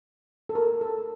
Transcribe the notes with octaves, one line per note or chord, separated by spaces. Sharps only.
A4
A#4
A4